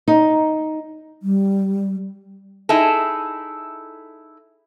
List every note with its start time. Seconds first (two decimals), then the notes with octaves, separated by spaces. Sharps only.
0.08 D#4
1.23 G3
2.69 D#4 E4 G#4 A4